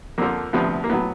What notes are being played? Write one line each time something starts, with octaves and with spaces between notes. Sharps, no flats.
F2 D3 F3 A#3
D2 C3 F3 B3
A#3
A2 F#3 B3